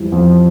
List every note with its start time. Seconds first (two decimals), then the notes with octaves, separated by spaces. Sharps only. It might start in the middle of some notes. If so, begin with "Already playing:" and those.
Already playing: F2 E3 G3
0.12 F2